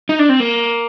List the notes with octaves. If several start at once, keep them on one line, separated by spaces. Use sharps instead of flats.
D#4
D4
C4
A#3